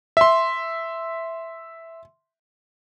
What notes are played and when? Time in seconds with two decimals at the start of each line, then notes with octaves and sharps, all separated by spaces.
0.17 E5 C6